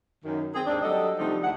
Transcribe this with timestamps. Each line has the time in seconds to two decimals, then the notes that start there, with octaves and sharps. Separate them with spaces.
0.25 F#2 D#3
0.55 C4 G#4
0.66 D#2 G#2 C4 D4
0.82 F#3 G3 D4 A4 D#5
1.18 C3 F3 G3 A3 D4 D#4
1.43 D2 D4 E4 G#4 F#5